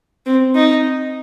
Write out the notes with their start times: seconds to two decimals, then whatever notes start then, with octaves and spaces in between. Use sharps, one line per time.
0.26 C4
0.55 D#4